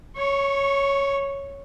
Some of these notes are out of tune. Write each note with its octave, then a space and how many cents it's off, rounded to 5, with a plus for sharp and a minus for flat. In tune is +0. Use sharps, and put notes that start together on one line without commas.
C#5 +0 C#6 -25